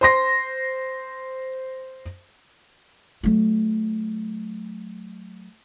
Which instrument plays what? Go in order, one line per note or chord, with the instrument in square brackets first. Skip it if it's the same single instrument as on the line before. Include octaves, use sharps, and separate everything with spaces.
[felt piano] C5 C6 A#6
[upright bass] F#3 A3